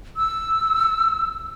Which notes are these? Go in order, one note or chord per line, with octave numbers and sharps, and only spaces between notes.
E6